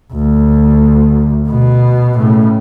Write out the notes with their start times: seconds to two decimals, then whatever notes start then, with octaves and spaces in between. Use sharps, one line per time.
0.13 D2
1.48 B2
2.17 A2 C#3